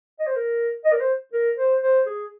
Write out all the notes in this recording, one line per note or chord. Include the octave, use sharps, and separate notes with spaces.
D#5
C5
A#4
D#5
A#4
C5
A#4
C5
C5
G#4